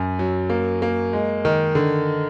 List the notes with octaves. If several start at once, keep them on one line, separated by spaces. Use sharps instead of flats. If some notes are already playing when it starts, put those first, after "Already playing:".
Already playing: F#2
F#3
A#3
A#3
G#3
D#3
D3